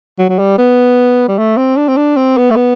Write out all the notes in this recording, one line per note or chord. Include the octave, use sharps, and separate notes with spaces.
F#3
F#3
G3
B3
G3
A3
C4
D4
C4
D4
C4
B3
A3
B3